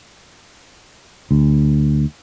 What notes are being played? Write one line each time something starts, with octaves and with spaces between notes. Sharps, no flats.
D2